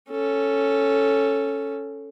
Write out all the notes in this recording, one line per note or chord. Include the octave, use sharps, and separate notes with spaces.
C#4 A4